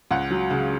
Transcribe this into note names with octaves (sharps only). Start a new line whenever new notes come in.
C#2 F#5
F#3
C#3